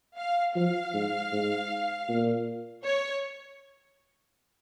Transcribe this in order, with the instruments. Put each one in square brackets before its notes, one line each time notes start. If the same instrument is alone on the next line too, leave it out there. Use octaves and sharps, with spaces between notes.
[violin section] F5
[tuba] F3 [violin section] F5
[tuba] G#2
G#2
A#2
[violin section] C#5